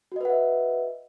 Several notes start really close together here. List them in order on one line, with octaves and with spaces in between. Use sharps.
F#4 D#5 B4 F#5 E5